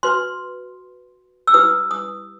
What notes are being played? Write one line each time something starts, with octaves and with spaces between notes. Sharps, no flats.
F#4 B4 C6
E6
E4 G4 B4 D#6
D#6